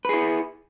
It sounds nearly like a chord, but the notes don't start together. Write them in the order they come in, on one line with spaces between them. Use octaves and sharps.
B4 G#4 E4